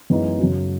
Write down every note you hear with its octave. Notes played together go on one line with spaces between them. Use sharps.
F#2 E3 G#3 B3 D#4
F#2 C#3 F#3